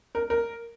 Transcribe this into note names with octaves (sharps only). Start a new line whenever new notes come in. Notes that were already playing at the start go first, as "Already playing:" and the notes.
A#4
A#4